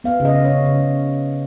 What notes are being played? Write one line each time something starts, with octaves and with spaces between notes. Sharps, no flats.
B3 F5
C#3
D#5
C#3
C#5
C#3
C#3
C#3